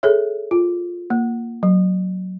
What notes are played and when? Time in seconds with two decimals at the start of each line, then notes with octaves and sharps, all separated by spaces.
0.03 G#4 A4 C#5 E5
0.51 F4
1.10 A#3
1.63 F#3